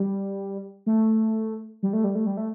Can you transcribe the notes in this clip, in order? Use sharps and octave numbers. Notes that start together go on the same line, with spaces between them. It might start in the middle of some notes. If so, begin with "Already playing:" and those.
Already playing: G3
A3
G3
A3
G3
A3
G3
A3